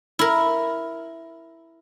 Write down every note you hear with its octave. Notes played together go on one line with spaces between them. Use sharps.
E4 A#4